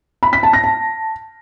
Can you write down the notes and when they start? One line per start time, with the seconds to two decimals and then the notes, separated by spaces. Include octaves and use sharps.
0.23 B5
0.33 B6
0.43 A5
0.53 A#6
0.64 A5